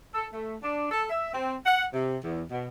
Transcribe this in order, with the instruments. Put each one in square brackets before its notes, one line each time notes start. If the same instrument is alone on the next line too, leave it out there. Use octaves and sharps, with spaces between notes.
[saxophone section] A4
A3
D4
A4
E5
C4
F#5
C3
E2
B2